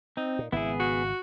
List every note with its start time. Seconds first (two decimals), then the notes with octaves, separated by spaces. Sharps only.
0.17 C4 D#4
0.39 A#2
0.52 G#1 C#3 B3 E4 G#4
0.80 F#4